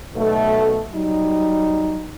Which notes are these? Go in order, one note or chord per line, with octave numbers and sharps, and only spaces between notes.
B1 B2 A3
F#3 G3 D#4